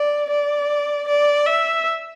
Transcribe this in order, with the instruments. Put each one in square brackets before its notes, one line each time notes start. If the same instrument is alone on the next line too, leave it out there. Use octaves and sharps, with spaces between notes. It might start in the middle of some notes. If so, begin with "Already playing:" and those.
Already playing: [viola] D5
D5
D5
E5